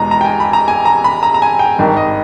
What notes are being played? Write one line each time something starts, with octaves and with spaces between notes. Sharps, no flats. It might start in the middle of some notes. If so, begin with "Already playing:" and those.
Already playing: E2 B2 G#3 A#5
A#5
G5
G#5
B5
A#5
G#5
A#5
B5
A#5
A#5
G#5
G5
G#1 G2 D#3
D#5